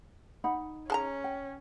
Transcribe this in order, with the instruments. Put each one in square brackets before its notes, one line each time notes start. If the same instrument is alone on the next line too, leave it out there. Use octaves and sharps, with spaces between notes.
[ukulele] D#4 F#5 B5
[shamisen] G#3 A5 A#5 [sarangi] C#4
[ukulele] G5